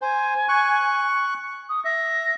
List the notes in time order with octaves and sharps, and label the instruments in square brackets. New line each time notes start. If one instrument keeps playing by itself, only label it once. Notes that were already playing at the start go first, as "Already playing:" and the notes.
[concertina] C5 [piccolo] G#5
[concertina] C#6 F#6
[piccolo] D#6
[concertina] E5 [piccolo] A#6